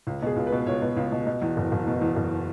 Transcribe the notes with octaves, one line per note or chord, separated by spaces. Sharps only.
C#2
B2 G#4
C#2
B4
B2
C#2 C#5
B2
C#2
B2
B2
E2
F#1
F#1
B2
E2
F#1